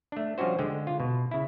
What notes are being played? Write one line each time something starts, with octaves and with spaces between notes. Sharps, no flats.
A3 D4
F3 G3 C#4 D4 F#4 C5
D3 G#3 G5
F4
B2
C#3 E4